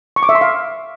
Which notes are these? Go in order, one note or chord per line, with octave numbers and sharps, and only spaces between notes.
C#6
D6
E5
C6
F5